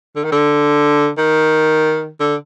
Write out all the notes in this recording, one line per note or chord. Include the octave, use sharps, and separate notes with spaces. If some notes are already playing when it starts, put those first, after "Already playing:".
D3
D#3
D3
D#3
D3